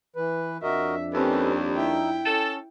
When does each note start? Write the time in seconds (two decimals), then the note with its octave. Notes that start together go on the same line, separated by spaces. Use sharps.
0.16 E3 B4
0.63 F2 D4 F#4 A#4 D#5 E5
1.13 D#2 C4 C#4 G4 A4 B4
1.77 D#4 E4 E5 G5
2.26 C#4 A4